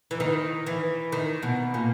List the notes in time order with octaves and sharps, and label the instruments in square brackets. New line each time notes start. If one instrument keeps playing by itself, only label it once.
[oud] E3
D#3
E3
D#3
B2
A#2